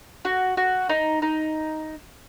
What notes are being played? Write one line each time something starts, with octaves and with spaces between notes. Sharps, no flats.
F#4
F#4
D#4
D#4